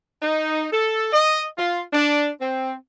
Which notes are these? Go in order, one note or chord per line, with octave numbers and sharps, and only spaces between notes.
D#4
A4
D#5
F4
D4
C4